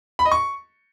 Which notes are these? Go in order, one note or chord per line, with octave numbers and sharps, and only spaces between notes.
B5
D#5
C#6